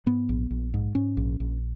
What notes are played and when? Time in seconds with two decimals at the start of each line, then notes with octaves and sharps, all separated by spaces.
0.06 G#2 B3
0.29 A#1
0.51 A#1
0.74 G#2
0.95 G#2 C#4
1.17 A#1
1.40 A#1